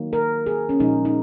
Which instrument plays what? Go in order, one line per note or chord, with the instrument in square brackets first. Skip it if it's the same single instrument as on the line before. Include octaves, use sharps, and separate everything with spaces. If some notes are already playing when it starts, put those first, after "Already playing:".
Already playing: [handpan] D#3 F#3 A#3
A#4
G#4
C#4
A#2 F3 G#3 D#4
D#4